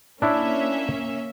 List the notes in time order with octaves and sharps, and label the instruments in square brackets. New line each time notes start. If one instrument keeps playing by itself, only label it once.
[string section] A#3 C#4 E5 [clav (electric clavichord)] D4 E4 C#5